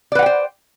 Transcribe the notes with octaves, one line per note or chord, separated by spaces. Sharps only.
B4 C5 D5 F#5 G5